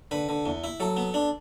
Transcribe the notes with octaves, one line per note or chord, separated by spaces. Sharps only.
D3 B4
D3
E2
E4
F#3 A4
B3
D4